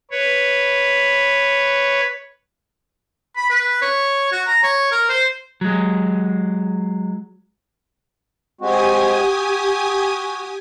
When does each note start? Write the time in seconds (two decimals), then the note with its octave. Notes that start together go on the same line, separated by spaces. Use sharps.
0.11 B4 C#5
3.37 B5
3.50 B4
3.82 C#5
4.32 F#4
4.47 A#5
4.63 C#5
4.91 A#4
5.09 C5
5.61 F#3 G#3
8.61 G#3 C4 F#4 G4 G#5 D#6
9.18 F#4